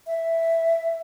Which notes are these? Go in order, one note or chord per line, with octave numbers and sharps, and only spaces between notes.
E5